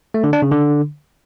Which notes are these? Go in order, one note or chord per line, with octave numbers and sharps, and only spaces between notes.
A3
D3
D4
C#3
D3